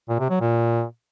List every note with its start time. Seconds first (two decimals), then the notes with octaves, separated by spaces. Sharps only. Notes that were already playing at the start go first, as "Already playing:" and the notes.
0.09 A#2
0.20 C3
0.30 F#3
0.41 A#2